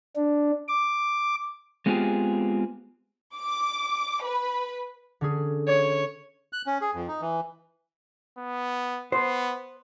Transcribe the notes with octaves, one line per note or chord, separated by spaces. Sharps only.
D4
D6
G#3 B3 C4 F4 G4 G#4
D6
B4
D3 C#4 G#4
C#5
F#6
C#4
G#4
F2
D#4
E3
B3
B3 C5